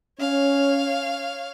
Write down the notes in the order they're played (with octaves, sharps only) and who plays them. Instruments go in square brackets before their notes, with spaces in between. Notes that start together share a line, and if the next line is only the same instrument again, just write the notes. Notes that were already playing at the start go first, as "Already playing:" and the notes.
[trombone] C#4 [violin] C#5 F5